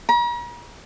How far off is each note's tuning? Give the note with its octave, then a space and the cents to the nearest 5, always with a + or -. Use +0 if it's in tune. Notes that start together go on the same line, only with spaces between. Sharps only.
A#5 +45